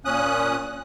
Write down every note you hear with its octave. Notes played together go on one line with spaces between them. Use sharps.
A#2 C#4 D#6 F#6